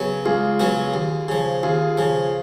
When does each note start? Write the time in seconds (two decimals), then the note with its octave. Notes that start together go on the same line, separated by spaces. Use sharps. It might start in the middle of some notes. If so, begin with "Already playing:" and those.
Already playing: C#3 F#3 B3
0.25 C#2 F4 G#4
0.60 C#3 F#3 B3 F#4
0.94 D#2
1.28 C#3 F3
1.63 D#2 F4 G#4
1.97 C#3 F3